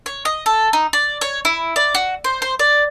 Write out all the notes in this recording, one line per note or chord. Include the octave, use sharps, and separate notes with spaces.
C#5
D#5
A4
D#4
D5
C#5
E4
D5
F#4
C5
C5
D5